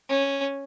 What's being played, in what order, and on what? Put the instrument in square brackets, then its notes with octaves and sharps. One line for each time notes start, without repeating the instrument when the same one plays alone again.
[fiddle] C#4